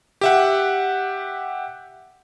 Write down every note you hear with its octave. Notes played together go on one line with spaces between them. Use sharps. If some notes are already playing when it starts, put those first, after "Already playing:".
G4 E5 F#5